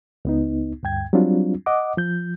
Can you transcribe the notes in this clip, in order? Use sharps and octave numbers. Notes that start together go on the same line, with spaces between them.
C#2 B3 D#4
D2 G2 G5 G#6
F#3 G3 C4 D4 F4
D#5 F#5 D6
F3 G6